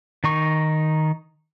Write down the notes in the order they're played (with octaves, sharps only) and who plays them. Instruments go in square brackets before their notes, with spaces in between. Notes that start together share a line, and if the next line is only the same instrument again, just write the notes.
[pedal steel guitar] D#3 D#4 C#6